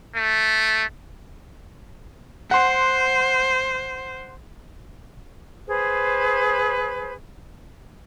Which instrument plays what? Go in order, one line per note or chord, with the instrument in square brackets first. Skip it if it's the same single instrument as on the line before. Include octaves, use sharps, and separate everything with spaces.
[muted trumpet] A3
[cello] C5 [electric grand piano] F#5 C6
[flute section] G#4 B4 C5